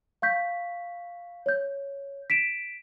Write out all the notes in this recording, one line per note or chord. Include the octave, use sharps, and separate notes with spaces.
F5 C#6 G6 B6
C#5 G6
B6 D7 E7